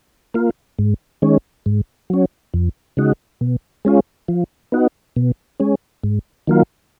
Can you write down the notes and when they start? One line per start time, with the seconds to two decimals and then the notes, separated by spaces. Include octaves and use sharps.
0.34 A#3 F4
0.79 G#2
1.22 D#3 G#3 C#4
1.66 G#2
2.10 F#3 C#4
2.54 F2
2.97 C#3 G#3 D#4 F#4
3.41 B2
3.85 G#3 C#4 F4
4.28 F3
4.72 B3 D#4 F#4
5.16 B2
5.60 G#3 C#4
6.03 G#2
6.47 D#3 F#3 A#3 F4